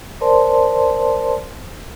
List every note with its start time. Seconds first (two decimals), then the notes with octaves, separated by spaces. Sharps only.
0.21 A#4 C5 D5 A5 C6